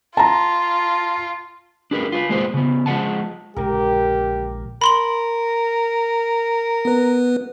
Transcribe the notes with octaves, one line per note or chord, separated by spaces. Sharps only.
F4 A5 A#5
D4 G#4 A#4 B4
F4 B4
G#3 A#3 G#4 B4 C5
C#3 B3
F3 G#3 A#4 F#5 A5
A#1 C#3 G#3 G4 A#4
A#4 B5 C6 F#7
B3 B4